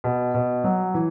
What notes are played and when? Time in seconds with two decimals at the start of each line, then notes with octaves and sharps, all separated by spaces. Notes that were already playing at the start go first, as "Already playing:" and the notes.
0.04 B2
0.34 B2
0.64 F#3
0.94 E3